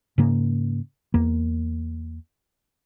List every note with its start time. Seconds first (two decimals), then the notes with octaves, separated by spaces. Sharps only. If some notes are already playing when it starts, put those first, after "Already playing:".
0.18 G#2 C#3 A#3
1.14 E2 A#3